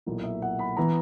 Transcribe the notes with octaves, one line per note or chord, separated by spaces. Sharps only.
B1 A#2 A#3 E4
E5
F#5
B5
E3 B3 A#5